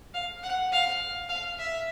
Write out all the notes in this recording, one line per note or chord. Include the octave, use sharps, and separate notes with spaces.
F5
F#5
F5
F5
E5